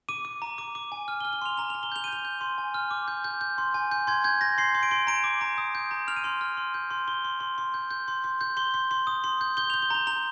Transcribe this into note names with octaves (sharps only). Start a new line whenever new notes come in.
D6 D#7
D6
A#5
D6
D6
G#5
F6
G7
F6
G7
C6 F7
A#5 F7
A#5 F7
G7
G6 F7
D#7
G6 F7
G6
C6
G#5
F6
D6
G6
G6
G6
C6
G#5
G6
C6 G#6
G6 G#6
G6 A#6
C6 C7
C6
D7
C6
A#5 D7
D6
A#5
D#6
G6
A#5
F6 F7
D#7
C6 F7
F6
C6
G6
C6
C6 G7
C6
C6
C6
G6
G6
C6
C6
G6
C6 G7
C6
C6
D#6
C6
G6
G6 G7
G6 F7
G7
A#5 F7
A#5 F7